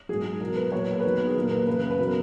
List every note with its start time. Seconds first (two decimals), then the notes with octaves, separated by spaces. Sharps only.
0.09 G#2 F#3 G#4
0.40 E2 B2 F#3 A#4
0.56 B4
0.72 A#2 F#3 C#5
0.82 B4
0.90 A#4
1.00 E2 D#3 F#3 B4
1.27 G#4
1.36 A#2 F#3 A#4
1.51 B4
1.67 F#2 C#3 F#3 B4
1.91 B4
1.98 B2 F#3 A#4